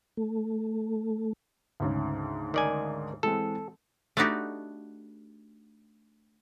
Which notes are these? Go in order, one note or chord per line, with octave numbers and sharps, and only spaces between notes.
A3
D2 G#2 C#3
D#3 D5 G#5
E3 G#3 C4 A4
A3 B3 D4 D#4 F#4 G4